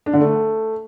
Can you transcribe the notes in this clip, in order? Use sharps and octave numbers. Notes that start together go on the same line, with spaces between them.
D4
D3
A3